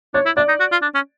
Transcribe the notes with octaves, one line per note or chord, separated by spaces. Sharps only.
D4 C#5
E4
D4 D5
D#4
F#4
F4
D4
C#4